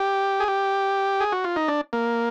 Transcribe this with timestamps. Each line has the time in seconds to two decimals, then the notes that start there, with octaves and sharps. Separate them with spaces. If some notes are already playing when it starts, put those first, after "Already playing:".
Already playing: G4
0.40 G#4
0.48 G4
1.20 G#4
1.32 F#4
1.44 F4
1.56 D#4
1.68 D4
1.93 A#3